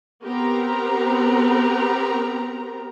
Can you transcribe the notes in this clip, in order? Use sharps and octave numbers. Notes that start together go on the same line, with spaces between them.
B3 C4 G4 A#4 A#5